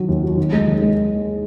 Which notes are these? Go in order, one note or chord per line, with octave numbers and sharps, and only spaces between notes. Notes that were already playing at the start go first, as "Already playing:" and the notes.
Already playing: D#3 F#3
D#2
F#3
D#2
G#3
D#3
G#3